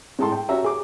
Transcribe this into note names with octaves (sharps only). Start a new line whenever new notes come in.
A2 G#3 A4 A5 C6
G5
C#4 F#4 G4 E5 A#5
G#4 D6